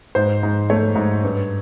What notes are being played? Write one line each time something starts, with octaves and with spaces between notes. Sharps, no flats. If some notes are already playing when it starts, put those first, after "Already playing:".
G#2 C5
G#2
A3 C#5
G#2
G2